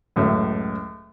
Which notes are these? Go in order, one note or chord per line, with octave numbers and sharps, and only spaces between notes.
C#2 F#2 A2 E5